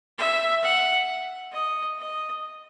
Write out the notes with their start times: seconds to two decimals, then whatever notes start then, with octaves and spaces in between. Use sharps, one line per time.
0.18 E5
0.63 F#5
1.52 D#5
1.99 D#5